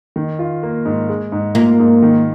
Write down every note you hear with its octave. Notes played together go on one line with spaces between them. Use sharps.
D#3
F4
A#3
G#2
G#3
G#2
A#3 F4
G#2
D#3